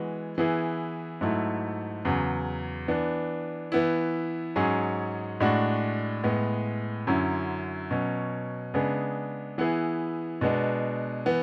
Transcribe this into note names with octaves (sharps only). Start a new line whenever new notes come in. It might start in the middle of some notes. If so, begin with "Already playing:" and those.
Already playing: E3 G#3 B3 F#4
E3 B3 E4 G#4
G#2 F#3 A3 E4
E2 C#3 F#3
E3 B3 D4
E3 B3 E4
G#2 F#3 C#4 G#4
A2 G#3 D4 F#4
A2 G#3 B3
F#2 D3 F#3 C#4 E4
B2 F#3 C#4
C#3 G#3 B3 D4 G#4
E3 B3 E4 G#4
B2 G#3 B3 D4
E3 B3